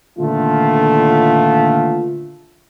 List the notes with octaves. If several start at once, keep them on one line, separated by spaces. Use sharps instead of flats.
A#2 D3 D#3 A3 B3 F4